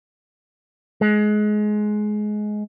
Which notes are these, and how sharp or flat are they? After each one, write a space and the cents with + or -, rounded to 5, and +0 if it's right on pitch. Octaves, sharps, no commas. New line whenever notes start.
G#3 +20